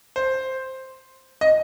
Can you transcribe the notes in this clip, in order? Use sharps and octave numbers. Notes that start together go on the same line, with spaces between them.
C5
D#5